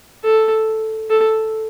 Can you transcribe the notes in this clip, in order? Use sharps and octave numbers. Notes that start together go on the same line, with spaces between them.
A4
A4